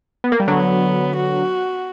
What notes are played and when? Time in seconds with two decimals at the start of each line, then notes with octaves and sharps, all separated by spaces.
0.24 B3
0.32 A#3
0.40 G3
0.48 D3 F#3 B3
1.16 F#4